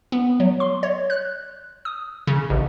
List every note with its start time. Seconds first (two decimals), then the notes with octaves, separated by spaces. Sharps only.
0.12 B3
0.40 F#3
0.60 C6
0.83 C#5
1.10 F#6
1.85 D#6
2.27 C#3
2.50 A1